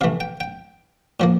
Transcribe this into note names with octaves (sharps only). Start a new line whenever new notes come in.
C3 E3 A3 F5
G5
G5
A2 F3 A#3